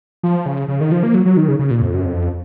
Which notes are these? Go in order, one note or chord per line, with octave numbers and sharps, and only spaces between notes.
F3
C#3
C#3
D#3
F3
A#3
F#3
F#3
D#3
C#3
C#3
A#2
F2
F#2
F2